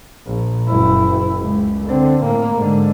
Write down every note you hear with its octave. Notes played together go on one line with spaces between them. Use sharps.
A#1
F#1 E4
C#2
D3 C4
A2 A#3
G#2 D3